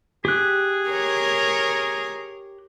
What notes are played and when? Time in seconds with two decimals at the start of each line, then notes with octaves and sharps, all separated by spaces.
0.25 G4 G#4 F#6
0.89 A#4 C#5